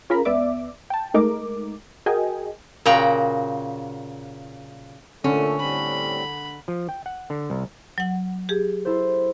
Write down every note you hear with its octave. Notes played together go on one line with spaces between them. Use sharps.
C#4 F4 G#4 A#4 A#5 B5
C#2 B3 D5 E5 D6
G5 A5
G#3 A3 D#4 A#4 D6
F#4 G#4 A#4 D#5 G5 G#5
A#2 C#3 F#4 G5 A#5
A#2 D3 A3 C#4 A4
A2 G3 C4 B5
F3
G5
F#5
D3
C2
F#3 F#5
G4 G#4
E4 A4 C5